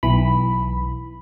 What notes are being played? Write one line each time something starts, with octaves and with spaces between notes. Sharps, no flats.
B1 E3 B5